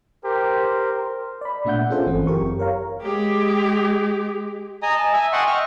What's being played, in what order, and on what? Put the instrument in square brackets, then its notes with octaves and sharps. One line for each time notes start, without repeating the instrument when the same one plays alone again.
[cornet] G4 [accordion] A#4 C5
[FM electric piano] D5 B5
A#2 A3 D4 E5 F#5 G6
C#4 F4 G#4 A4 C5
G1 E3 C4
F#2 G4 A#4 C#6
A#4 C#5 F5 A#5
[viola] G#3 G4
[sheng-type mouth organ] D#5 G#5 A#5 D#6
A5
E5 G#5
D#5 F#5 G5 A5 C6 C#6
E5 C#6 F6